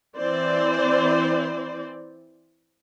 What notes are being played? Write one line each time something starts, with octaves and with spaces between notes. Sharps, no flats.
E3 C4 C5 D5